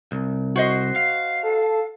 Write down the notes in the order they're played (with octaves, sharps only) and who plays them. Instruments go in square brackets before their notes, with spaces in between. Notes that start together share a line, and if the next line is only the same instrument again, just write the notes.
[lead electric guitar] C2
[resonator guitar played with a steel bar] F#4 C5 D#5 [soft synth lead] C7
[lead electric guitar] F5
[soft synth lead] A4